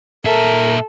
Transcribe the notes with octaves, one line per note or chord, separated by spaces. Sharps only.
A#2 A4 A#4 E5